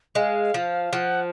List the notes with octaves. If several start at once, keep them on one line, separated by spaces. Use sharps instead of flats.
G#3 F5
F3
F3 F#5